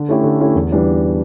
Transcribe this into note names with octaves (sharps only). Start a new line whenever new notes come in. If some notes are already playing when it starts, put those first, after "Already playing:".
Already playing: D3
A3 C#4 E4 G4
D3
A3 C#4 E4 G4
E2
E3 G3 D4 F4